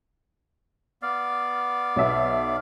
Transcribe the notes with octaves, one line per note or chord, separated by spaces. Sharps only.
B3 D5 F5
B1 E5